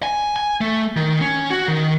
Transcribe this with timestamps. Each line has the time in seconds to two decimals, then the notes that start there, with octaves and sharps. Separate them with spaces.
0.03 G#5
0.36 G#5
0.61 A3
0.97 D#3
1.21 C#4
1.50 F#4
1.68 D#3